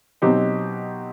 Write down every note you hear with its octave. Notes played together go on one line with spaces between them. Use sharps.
B2 F#3 C4 D#4 G4